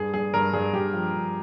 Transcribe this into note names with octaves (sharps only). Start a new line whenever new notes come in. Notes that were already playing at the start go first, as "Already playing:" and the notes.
Already playing: G2 G#4
G2 G#4
G2 A#4
G2 G#4
G2 G4
F3
G2